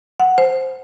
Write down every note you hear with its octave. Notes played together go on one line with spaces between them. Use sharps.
F#5
C5